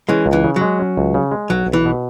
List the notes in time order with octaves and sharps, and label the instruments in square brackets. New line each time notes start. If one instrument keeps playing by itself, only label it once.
[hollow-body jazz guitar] E3 G#3 [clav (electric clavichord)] C#4
[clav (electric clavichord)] C#2
[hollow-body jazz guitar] E3
[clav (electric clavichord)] C#3
[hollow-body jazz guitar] F#3
[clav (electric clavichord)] G#3
C#4
C#2
C#3
G#3
[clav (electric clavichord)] B1 [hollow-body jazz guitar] F#3
[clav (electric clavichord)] B1
[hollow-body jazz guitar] E3
[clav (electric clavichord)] B2